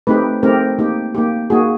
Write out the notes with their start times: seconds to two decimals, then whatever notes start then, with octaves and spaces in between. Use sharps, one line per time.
0.07 A3 C4 D#4 G4 B4
0.43 A3 C4 D#4 G4 A#4
0.79 A#3 D#4 G4
1.15 A#3 D#4 G4
1.50 A#3 D#4 F#4 G#4